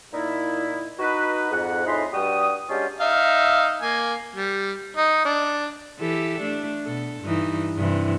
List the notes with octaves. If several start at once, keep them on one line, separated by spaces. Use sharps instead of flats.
A#2 D#4 E4
D#4 F#4 B4
F2 G#2 F#5
F2 A2 D#4 G#4 B5 C6
G2 G3 F#4 G4 D#6
F#3 G#3 C#4 D4 F4 G4
D#4 E5 F5
A#3 G#5
G3
D#4
D4
E3 G4 A4
A3 D4
B2 A4
G2 E3 D#4
G2 C3 E3